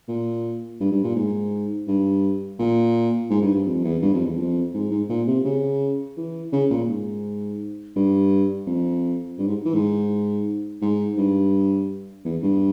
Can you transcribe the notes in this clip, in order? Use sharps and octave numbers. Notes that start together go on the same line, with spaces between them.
A#2
G2
G2
A#2
G#2
G2
A#2
G#2
G2
G2
F2
E2
G2
F2
E2
F2
G#2
G#2
A#2
C3
C#3
E3
C#3
A#2
G#2
G2
F2
G2
G#2
E3
G#2
G#2
G2
E2
G2